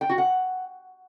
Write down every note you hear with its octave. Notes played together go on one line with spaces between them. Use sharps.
G5
F#4
F#5